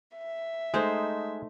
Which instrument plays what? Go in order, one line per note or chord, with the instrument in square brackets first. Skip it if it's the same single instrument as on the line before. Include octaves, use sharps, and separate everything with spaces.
[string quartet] E5
[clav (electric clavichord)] G#3 [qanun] A3 D#4 C5